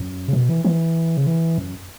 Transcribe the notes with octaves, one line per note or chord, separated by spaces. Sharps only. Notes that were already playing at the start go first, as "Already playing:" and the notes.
Already playing: F#2
C#3
B2
E3
E3
C#3
E3
F#2